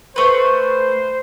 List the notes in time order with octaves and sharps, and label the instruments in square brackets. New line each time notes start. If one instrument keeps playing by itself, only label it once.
[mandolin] A3 B4 [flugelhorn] C5